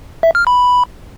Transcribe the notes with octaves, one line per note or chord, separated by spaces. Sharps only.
E5
F6
B5